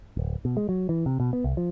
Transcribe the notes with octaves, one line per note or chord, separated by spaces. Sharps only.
D1
B2
G#3
F#3
E3
C3
B2
B3
C2
F3